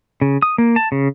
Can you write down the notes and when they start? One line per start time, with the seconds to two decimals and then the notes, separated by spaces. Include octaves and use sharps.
0.22 C#3
0.42 D#6
0.58 A#3
0.76 A5
0.92 C#3